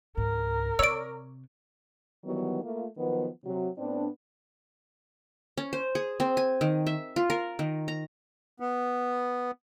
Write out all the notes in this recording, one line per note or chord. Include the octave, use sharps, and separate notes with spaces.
C#2 G#2 A#4
C3 C#5 D5 E6 D7
D#3 E3 F#3 G3 B3
A3 A#3 F4
D#3 F3 F#3 B3
C3 F#3
A2 B3 C4 D4
C#4
C5
G#4
C4
G#5
D#3
E5
F4
A#4
D#3
A#5
B3